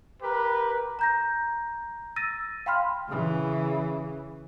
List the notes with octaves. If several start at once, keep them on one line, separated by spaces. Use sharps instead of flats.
G4 A#4 B4
A#5 G6 A#6
E6 A6 A#6 D#7
F5 G5 B5 C6 F6
C#3 E3